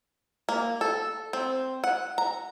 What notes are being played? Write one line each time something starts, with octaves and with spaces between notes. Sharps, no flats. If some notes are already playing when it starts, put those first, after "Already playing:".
A#3
A4
C4
F#5
A#5